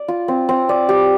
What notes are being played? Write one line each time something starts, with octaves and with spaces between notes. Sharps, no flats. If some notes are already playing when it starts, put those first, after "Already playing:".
Already playing: D5
F4
C4
C4
D5
G4